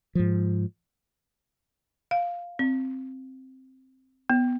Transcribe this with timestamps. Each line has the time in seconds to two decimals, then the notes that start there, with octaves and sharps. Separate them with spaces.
0.15 G#2 F3
2.11 F5
2.59 C4
4.30 B3